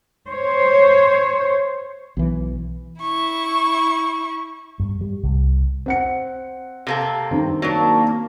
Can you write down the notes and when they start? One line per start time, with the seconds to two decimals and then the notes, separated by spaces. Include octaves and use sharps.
0.28 C5 C#5
2.17 B1 E3
3.01 E4 C#6
4.80 G2
5.01 G3
5.23 C2
5.86 C4 F#5 C#7
6.87 C3 A#3 A4
7.31 G2 D#3 C4
7.62 F#3 A#3 D4